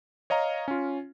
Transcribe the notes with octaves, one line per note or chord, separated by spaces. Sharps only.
C#5 D#5 F5 A#5
C#4 F4